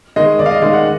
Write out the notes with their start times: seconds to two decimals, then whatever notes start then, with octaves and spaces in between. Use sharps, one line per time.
0.16 D#3 G#3 D#5
0.39 D#2 D5
0.46 F5
0.51 D#5
0.62 D#3 G#3 F5
0.73 F#5